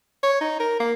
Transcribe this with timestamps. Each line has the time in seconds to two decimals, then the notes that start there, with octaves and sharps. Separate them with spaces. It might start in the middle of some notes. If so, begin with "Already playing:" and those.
0.23 C#5
0.41 D#4
0.60 A#4
0.80 A#3